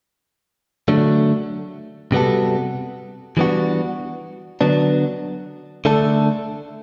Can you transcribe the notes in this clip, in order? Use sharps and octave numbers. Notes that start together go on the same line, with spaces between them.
D3 F#3 A3 D4
C3 G3 B3 F#4 A4
E3 G3 B3 D4 F#4
D3 F#3 B3 D4
D3 A3 D4 A4